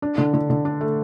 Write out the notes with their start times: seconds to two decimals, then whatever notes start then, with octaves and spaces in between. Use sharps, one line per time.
0.02 D4
0.18 D3
0.34 D3
0.50 D3
0.65 D4
0.81 A3